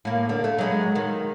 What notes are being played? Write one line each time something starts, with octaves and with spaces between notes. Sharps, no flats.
A2 A#3
D3
A3
F#3 G#3 B3
D#3